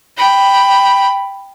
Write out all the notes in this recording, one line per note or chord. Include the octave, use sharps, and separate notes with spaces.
G5 B5